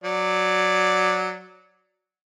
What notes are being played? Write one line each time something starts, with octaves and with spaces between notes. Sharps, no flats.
F#3 D5